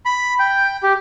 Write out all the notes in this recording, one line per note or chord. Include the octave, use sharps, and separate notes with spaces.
B5
G5
G4